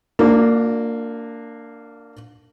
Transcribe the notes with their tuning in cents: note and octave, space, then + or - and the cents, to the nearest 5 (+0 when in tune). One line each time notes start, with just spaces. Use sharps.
A#3 -20 D4 +0 F4 +45